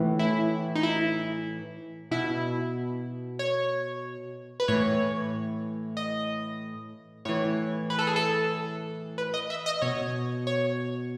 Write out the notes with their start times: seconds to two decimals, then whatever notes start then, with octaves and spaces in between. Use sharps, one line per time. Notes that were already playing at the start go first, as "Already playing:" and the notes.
Already playing: A2 E3
0.19 E4
0.75 D#4
0.83 E4
2.11 B2 E4
3.39 C#5
4.60 B4
4.68 A2 E3 C#5
5.97 D#5
7.25 A2 E3 C#5
7.90 B4
7.99 A4
8.07 G#4
8.16 A4
9.18 B4
9.34 D#5
9.50 E5
9.66 D#5
9.82 B2 C#5
10.47 C#5